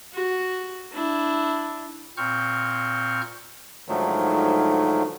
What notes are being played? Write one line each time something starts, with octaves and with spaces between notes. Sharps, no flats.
F#4
D4 E4
A#2 C4 C#6 F6 G6
G#2 D3 D#3 F3 F#3 A3